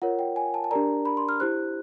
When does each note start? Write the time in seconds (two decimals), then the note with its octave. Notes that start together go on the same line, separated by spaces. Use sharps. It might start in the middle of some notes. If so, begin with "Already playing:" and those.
0.02 F4 A#4 C#5 F#5
0.19 G5
0.36 G#5
0.54 A5
0.64 A5
0.71 D4 G4 A#4 D5 A#5
1.05 B5
1.17 C6
1.29 F6
1.40 E4 G4 C5 F#6